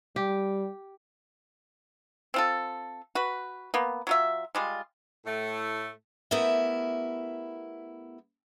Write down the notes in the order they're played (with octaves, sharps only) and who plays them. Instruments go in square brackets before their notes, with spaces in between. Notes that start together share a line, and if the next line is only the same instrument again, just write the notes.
[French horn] G3 [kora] G4
[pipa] C4 F4 A4
F#4 B4
A#3 B3
F#3 F4 E5
G3 G#3 F4
[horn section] A2 A3
[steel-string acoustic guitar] A3 B3 E4 G4 A#4 E5